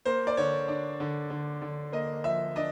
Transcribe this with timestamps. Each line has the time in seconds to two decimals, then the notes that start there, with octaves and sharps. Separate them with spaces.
0.05 A#3 C5
0.27 D5
0.37 D3 C#5
0.68 D4
1.00 D3
1.30 D3
1.62 D3
1.92 A#3 D#5
2.24 F3 E5
2.56 D4 D#5